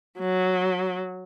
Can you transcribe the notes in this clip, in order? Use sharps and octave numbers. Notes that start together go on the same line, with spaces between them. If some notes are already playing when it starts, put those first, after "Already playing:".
F#3